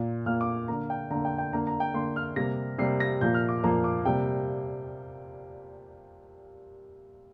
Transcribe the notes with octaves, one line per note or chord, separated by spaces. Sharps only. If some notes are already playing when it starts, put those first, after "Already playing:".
Already playing: A#2 A#3
A#2 A#3 F6
D6
D3 A#3 A#5
G5
D3 A#3 A#5
G5
G5
D3 A#3 A#5
A#5
G5
D3 A#3 C6
F6
C3 G3 A#3 A#6
C3 G3 A#3 C7
A#6
A#2 F3 A#3 G6
F6
D6
A#2 F3 A#3 A#5
D6
C3 G3 A#3 G5